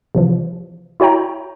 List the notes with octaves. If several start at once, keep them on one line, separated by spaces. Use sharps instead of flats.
C3 E3 F3
E4 F#4 C#5 G5 A#5